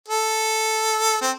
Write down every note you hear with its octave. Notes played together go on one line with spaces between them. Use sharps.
A4
C4